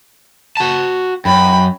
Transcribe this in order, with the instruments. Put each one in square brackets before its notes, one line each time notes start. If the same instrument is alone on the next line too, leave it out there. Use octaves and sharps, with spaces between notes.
[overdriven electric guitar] F#4 A5
[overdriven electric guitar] F#2 [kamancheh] G5 B5